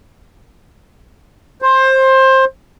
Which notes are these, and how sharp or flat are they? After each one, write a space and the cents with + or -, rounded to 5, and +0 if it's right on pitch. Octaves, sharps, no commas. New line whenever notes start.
C5 +20